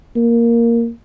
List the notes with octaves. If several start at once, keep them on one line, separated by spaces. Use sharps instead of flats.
A#3